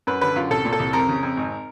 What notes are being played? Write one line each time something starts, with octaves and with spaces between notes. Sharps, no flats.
F#2 B4
D3 B4
F#2 F4
C2 A4
A#2
A4
C2
F2 A#4
C#3
F2
G#1